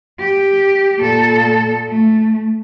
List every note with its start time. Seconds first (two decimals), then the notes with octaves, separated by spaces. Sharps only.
0.20 G4
0.99 A#2 A4
1.88 A3